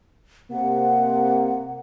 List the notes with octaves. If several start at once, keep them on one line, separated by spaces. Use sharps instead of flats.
C3 A#3 F#5